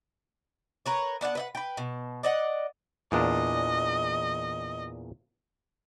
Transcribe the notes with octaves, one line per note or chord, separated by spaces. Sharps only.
A#4 B4 C#5
B3 D4 F5 F#5
B4 D#5 F#5
B4 G5
B2
D5 D#5 F#5
E2 A#2 D4 D#5